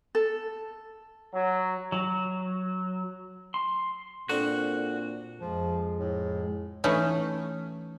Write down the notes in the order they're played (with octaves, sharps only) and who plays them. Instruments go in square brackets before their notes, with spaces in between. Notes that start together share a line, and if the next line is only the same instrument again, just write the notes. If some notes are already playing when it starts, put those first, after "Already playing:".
[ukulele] A4
[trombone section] F#3
[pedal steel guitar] F#3
C6
[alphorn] A#2 [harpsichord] C4 D4 A#4 [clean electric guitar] F#4 [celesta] A4
[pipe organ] F2 G#3 [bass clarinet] F3
[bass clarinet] A2
[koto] E3 A3 C#4 D#4